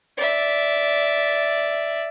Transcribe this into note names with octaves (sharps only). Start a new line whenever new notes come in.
D5 E5